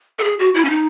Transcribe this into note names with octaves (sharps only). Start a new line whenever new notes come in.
A4
G#4
F#4
E4
C#4
D#4